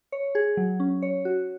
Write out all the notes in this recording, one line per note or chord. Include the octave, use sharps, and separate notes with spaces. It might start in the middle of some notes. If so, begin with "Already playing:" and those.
C#5
G#4
F#3
C#4
C#5
F#4